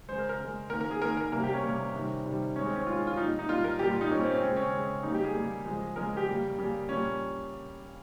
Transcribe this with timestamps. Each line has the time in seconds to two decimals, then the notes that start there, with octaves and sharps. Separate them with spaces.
0.09 C#3 G#3 C5
0.19 A#4
0.29 A#4
0.40 C#3 G#3
0.70 D#3 A#3 A#4
0.81 A#4
0.91 G#4
1.01 D#3 A#3 A#4
1.17 A#4
1.32 C3 G3 A#3 A#4
1.43 G4
1.53 C#4
1.64 C3 G3 A#3
1.95 C3 D#3 G3
2.26 C3 D#3 G3
2.56 D#3 G#3 C#4
2.66 C4
2.76 C#4
2.87 D#3 G#3 F4
3.07 F4
3.17 A#2 G3 A#3 D#4
3.39 D#4
3.49 A#2 G3 A#3 F4
3.64 A#4
3.79 A#2 G3 A#3 G4
3.91 F4
4.01 D#4
4.11 A#2 G3 A#3 C#4
4.21 C4
4.31 C#4
4.42 C#3 G#3 C4
4.57 C#4
4.73 C#3 G#3
5.03 C#3 G3 A#3 D#4
5.14 G4
5.24 G#4
5.35 C#3 G3 A#3
5.66 C#3 F3 G#3
5.96 C#3 F3 G#3 A#4
6.17 G4
6.27 C#3 G3 A#3
6.58 C#3 G3 A#3
6.89 A#2 G3 A#3 C#4